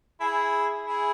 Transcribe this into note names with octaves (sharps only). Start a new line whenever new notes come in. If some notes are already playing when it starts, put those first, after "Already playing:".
E4 G#4
E4 G#4